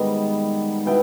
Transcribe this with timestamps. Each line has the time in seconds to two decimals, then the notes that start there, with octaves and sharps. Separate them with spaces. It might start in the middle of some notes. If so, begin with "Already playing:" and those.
Already playing: G#2 D#3 G3 B3 D#5
0.86 B2 B3 E4 G5